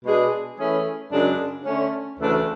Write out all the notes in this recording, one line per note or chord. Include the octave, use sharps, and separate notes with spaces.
B2 G#3 D4 G#4
E3 A3 C#4 G#4
F#2 C#3 G#3 D4
D3 A3 C#4
D2 C#3 E3 A3 D4